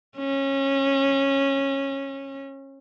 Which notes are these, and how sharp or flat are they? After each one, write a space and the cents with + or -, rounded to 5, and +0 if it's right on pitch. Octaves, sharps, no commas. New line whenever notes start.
C#4 -20